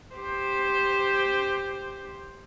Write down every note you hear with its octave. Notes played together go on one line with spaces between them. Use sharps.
G4 C5